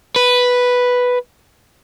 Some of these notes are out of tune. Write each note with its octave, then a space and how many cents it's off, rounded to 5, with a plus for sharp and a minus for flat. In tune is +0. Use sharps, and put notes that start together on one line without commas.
B4 +0